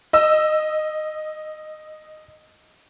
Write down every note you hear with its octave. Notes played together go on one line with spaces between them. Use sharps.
D#5 E6